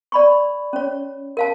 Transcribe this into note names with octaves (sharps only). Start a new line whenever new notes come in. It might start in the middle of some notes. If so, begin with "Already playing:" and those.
D5 B5 C#6
C#4 C#5
A#4 F5 A5